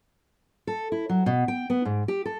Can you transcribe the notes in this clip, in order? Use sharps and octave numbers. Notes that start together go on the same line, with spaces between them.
A4
E4
F#3
B2
G5
B3
G#2
G4
A4